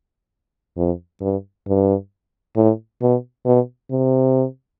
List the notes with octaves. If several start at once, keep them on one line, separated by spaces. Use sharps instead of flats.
F2
G2
G2
A2
B2
B2
C3